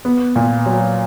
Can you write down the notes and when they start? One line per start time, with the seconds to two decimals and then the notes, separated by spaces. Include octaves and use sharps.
0.05 B3
0.36 A#2
0.66 F#3